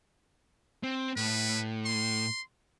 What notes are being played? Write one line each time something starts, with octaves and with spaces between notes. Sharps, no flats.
C4
A2 B4
C6